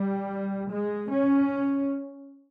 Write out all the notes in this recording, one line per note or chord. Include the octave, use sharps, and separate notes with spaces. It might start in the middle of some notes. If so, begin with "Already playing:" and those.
Already playing: G3
G#3
C#4